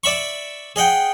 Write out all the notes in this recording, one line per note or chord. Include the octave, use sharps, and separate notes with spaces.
D5 E5 B5 C#6
G#4 D#5 F#5 G5